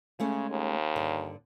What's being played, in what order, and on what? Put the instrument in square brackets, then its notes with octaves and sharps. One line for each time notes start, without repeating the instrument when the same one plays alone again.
[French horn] C#3 [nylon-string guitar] G#3 A3 C#4
[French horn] D#2
[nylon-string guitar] G2 D3